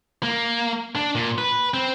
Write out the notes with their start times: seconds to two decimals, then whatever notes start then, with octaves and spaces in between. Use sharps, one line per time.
0.23 A#3
0.95 D4
1.15 A#2
1.38 B4
1.74 C4